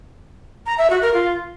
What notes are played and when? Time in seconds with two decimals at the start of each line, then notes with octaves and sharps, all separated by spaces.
0.66 A#5
0.78 E5
0.90 F#4
1.02 A#4
1.13 F4